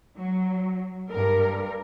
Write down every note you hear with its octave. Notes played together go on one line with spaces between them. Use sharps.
F#3
G2 A#4